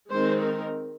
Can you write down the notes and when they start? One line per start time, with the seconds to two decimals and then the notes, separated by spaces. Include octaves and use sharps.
0.10 D#3 G#3 C4 D#4 C5
0.41 A#4